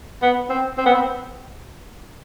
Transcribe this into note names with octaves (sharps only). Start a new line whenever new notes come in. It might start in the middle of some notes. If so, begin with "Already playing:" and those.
B3
C4
C4
B3
C4